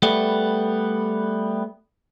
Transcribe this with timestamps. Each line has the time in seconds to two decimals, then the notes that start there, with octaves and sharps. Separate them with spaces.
0.02 G3 A3 B3